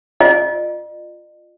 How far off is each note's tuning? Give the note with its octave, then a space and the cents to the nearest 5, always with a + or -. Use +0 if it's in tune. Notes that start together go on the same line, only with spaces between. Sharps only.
F4 +0 D#5 -45